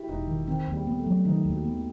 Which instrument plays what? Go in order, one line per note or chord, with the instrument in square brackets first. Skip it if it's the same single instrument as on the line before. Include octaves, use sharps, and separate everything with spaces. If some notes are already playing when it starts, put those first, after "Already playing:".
Already playing: [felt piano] E4 F#4 G4
[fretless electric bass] E1 [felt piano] D#4
[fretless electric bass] D#3
[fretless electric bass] D#3 [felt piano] C4
[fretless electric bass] D#2
[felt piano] G3
[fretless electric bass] B3
[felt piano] A3
[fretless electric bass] F#3
[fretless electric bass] D#3 [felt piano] D#4
[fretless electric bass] D#2
[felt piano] F#4
[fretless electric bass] B3